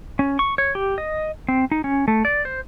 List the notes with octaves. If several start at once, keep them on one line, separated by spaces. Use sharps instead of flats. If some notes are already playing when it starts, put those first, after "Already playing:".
C#4
C#6
C#5
G4
D#5
C4
D#4
C#4
A3
D5
C5